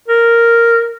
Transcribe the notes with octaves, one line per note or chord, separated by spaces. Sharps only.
A#4